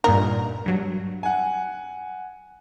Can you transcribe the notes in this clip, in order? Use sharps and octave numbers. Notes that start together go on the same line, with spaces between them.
G2 A#2 D#4 A#4
G2 F#3
F#5 G#5